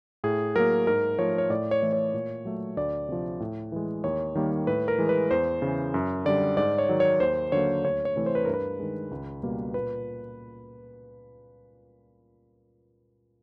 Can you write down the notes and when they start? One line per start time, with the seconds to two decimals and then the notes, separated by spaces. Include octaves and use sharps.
0.24 A2 G#4
0.55 F#3 A#3 A#4
0.87 G#2 A#4
1.19 F3 A3 C#5
1.38 C#5
1.50 A2 D5
1.71 C#5
1.82 E3 A3
1.93 C#5
2.14 A#2
2.45 F#3 A3
2.77 D2 D5
3.09 C3 F3
3.40 A2
3.72 E3 G#3
4.04 D#2 C#5
4.35 D#3 G3 A#3
4.67 A2 B4
4.88 A#4
4.98 E3 G#3
5.09 B4
5.31 E2 C5
5.62 C#3 E3
5.94 F#2
6.25 D3 G3 D5
6.57 G#2 D5
6.78 C#5
6.89 D#3 F#3
7.00 C#5
7.20 D#2 C5
7.52 D3 F#3 A#3 C#5
7.84 D2 C#5
8.05 C#5
8.16 C3 E3 A3
8.26 C5
8.35 B4
8.45 G2 A#4
8.54 B4
8.80 D#3 G#3
9.11 C#2
9.43 B2 G3 A#3
9.74 A#2 B4